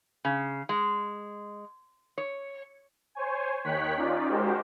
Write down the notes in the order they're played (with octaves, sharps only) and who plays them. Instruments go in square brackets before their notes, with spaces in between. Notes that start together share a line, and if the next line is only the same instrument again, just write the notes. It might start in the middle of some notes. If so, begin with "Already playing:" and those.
[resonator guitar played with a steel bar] C#3
G#3
C#5
[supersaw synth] C5 C#5 G#5
D#2 D#3 C#5 G5 F#6 B6
C#4 D#4 F4 D5
G#3 F#4 G4 A#4 C5